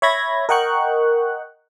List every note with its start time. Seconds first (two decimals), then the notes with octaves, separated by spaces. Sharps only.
0.02 C#5 E5 B5 G#6 A#6
0.49 A#4 D#5 F#5 G5 C#6 F#6